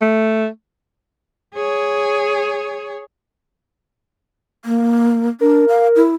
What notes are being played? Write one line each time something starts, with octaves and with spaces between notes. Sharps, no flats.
A3
G#4 C#5
A#3
D4 A#4
F5
E4